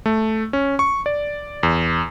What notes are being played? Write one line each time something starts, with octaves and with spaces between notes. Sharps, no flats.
A3
C#4
C#6
D5
E2